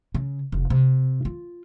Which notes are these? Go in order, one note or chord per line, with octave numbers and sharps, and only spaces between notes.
C#3
F1
C3
F4